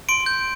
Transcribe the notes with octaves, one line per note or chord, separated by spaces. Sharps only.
C6 D7
G6